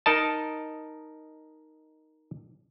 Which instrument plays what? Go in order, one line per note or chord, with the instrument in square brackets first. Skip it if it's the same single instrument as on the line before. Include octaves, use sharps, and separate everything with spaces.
[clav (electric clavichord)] D#4 A#4 D#5 A5